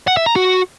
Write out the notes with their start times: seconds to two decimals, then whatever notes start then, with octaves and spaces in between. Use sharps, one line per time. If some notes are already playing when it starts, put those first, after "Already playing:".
0.07 F#5
0.17 E5
0.26 A#5
0.36 F#4